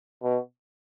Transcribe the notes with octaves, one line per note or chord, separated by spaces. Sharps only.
B2